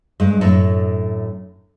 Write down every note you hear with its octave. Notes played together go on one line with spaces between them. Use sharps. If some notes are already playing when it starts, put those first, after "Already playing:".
G2 G#3
F#2 A2 A4 C#5